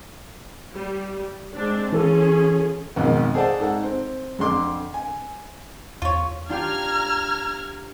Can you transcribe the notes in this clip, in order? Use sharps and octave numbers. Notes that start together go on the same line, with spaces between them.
G3
G#3 C4 D4
E3 C#4 F4 G#4 A4
G#1 F2 B2 D#3
G#4 A4 C5 D5 F#5 A5
G#2 A4 F#5
C4
F2 D3 C6 D6
G#5
E2 F4 C#5
D4 F4 G4 A#5 F6 G#6